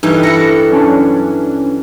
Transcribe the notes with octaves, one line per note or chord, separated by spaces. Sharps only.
G2 E3 D#4 A4
E4 A4 A#6 C#7
F#3 C#4 D4